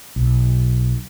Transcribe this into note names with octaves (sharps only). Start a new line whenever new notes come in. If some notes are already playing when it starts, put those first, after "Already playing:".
B1